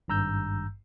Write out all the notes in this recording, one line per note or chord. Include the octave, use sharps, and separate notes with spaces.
G#1 G2 A#5 E6 G6